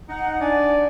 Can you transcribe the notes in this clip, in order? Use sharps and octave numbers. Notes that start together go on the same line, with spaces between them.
D#4 F#5
D4 D5 G#5